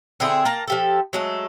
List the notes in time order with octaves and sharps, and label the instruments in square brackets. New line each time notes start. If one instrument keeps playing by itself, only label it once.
[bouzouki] D3 C4 E4 G#4
A#3 A5 A#5
F3 G4 A4
F#3 G#3 A3